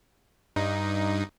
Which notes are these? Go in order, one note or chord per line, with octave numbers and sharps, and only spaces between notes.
G2 D#4